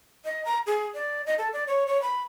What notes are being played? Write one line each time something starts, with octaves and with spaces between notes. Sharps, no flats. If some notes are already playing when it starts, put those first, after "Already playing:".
D#5
A#5
G#4
D5
D#5
A4
D5
C#5
C#5
B5